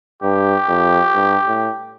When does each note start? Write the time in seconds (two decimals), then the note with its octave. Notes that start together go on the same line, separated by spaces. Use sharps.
0.23 G2 G4
0.68 F2
1.15 G2
1.47 A2